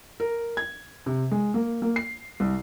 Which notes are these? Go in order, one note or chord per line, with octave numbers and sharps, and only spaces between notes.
A#4
G#6
C3
G#3
A#3
A#3
C7
C2